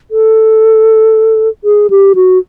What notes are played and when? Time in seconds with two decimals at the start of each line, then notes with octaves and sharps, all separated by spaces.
0.11 A4
1.64 G#4
1.90 G4
2.15 F#4